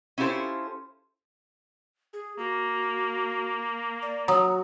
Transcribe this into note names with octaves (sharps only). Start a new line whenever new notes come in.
C#4 E4 F4 G4 A4 C5
G#4
A#3 F#4
D5
F#3 F#4 A#5 D#6